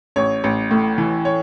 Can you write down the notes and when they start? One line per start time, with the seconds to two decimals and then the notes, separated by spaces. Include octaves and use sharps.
0.16 A1 C#5
0.44 A1
0.71 A2
0.98 E3
1.25 C#5